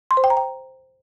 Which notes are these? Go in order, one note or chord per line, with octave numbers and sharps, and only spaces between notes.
C6
C5
G5
A#5
G5